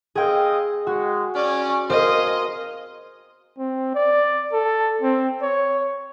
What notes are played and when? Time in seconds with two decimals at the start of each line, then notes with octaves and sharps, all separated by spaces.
0.15 C4 G#4 D#5 F5 G5
0.87 G#3 F#4
1.35 C#4 D5
1.90 C4 G#4 A#4 C5 D#5 F5 C6
3.58 C4
3.95 D5
4.53 A4
5.02 C4
5.42 C#5